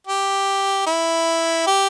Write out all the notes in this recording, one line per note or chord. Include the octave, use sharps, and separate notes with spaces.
G4
E4
G4